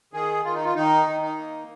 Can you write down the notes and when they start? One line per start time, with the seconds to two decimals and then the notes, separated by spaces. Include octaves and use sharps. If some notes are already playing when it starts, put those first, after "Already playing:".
0.13 D#3 G#4
0.44 D#3 F4
0.55 D#4
0.64 F4
0.75 D#3 D#4
1.06 D#3
1.22 D#4
1.37 A#3